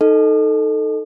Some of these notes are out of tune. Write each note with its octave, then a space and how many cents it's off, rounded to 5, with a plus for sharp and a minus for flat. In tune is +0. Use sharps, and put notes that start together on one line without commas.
D#4 +0 A4 +0 D#5 +0